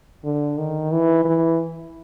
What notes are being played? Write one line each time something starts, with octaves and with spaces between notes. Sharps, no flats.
D3
D#3
E3
E3